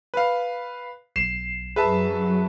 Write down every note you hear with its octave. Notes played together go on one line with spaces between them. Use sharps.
B4 F5
B1 C7 E7
F#2 F#3 G#4 B4 E5 A5